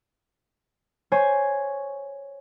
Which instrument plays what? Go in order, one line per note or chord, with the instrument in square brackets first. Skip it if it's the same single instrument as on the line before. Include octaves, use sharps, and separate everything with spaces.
[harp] C5 C#5 G#5